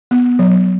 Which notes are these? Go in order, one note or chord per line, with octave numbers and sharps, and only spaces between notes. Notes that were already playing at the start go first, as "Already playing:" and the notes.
B3
F#3